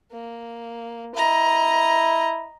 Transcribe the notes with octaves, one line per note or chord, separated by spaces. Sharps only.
A#3
E4 D#5 A#5